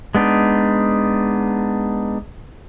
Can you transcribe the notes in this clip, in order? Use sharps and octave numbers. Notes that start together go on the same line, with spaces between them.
G#3 B3 D4 D#4